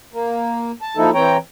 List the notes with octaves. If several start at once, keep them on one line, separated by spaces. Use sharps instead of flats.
A#3
A5
F3 A#3 D#4 E4 A4
E3 C4 C#5 G5 A#5